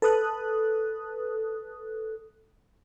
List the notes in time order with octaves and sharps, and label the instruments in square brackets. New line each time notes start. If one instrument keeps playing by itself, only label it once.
[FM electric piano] A4 B4 D#6 F#6